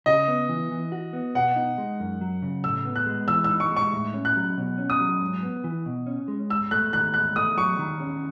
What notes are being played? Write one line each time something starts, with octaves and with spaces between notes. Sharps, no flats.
C#3 D#5
B3
E3
E3
F#4
B3
B2 F#5
D#4
G#3
F#2
F#3
C#3
A2 E6
B3
F#6
G#3
E3 E6
E6
D#4
C#6
G#3
C#6
A2
C#4
F#6
F#3
B2
C#4
D#6
F#3
G#2
B3
E3
B2
C#4
G#3
G#2 E6
A3 F#6
D#3 F#6
G#2 F#6
A3 D#6
F#3 C#6
D#3
C#4